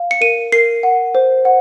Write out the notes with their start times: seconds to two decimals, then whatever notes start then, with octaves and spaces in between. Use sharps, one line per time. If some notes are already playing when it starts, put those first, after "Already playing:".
Already playing: F5
0.11 C#7
0.21 A#4 D#7
0.52 A#4 C7
0.83 F#5
1.15 C5
1.45 F#5